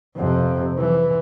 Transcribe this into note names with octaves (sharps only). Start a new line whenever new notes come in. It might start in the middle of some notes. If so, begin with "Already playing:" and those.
F2 C3
E3